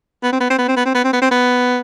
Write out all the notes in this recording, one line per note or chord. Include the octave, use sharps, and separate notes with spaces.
B3
C4
B3
C4
B3
C4
B3
C4
B3
C4
B3
C4
B3